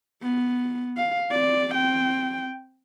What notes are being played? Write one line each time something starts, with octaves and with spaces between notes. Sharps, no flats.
B3
F5
C4 D5
C4 G5